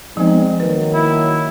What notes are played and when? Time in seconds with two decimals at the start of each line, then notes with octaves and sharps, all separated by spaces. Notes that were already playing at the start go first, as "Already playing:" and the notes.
0.17 F3 G#3 B3 C4 D#4
0.60 D#3 F#3 A#3 B4
0.94 E4